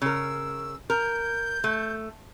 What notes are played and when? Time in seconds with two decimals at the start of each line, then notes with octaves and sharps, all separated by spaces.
0.02 C#3 A#4 E6
0.90 A#4 G6
1.64 A3